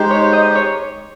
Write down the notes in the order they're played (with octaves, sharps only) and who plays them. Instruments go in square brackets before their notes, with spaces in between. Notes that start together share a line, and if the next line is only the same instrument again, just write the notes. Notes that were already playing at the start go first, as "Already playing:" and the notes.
Already playing: [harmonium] G#3 D#4 G4 C5
[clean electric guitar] C#5
D#5
C#5